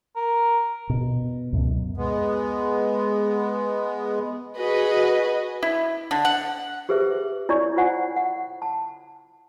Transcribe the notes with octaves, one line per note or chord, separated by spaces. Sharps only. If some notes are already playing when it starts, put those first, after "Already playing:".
A#4
B2
C#2 F#2 B2
G#3 B3
F#4 G#4 B4 D#5
E4
D3
F#5
G4 G#4 B4 C5 E5
E4 C#5 D5 G#5 C#6
F4 C5 F#5 G#5
F#5
A5